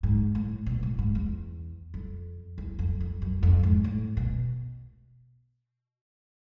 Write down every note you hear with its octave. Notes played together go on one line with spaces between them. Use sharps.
G#2
A2
B2
A2
G#2
E2
F2
E2
F2
F2
F#2
F2
G#2
A2
B2